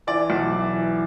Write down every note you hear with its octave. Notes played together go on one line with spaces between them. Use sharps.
E3 D5
B1
E3
E3